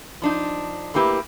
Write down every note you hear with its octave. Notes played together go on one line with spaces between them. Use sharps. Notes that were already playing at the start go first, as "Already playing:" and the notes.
F3 D4 D#4
A2 A#3 E4 G4 B4